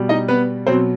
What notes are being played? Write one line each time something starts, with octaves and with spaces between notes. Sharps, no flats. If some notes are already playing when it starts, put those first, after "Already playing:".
Already playing: B2 G3
D#4 D#5
B3 B4
B2 F#3 C4 C5